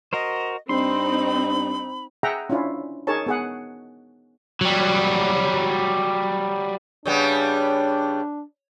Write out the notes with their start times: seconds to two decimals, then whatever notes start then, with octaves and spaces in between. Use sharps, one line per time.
0.13 F#4 A#4 C5 D#5
0.69 G2 C4 D#4 B5 C6
2.23 G#4 E5 F#5 G5 A#5
2.50 C#4 D4 E4 F4
3.07 D#4 G#4 A#4 C#5 A5
3.26 B3 G#4 F#5
4.61 F#3 G3
7.05 C#3 G3 B3 D4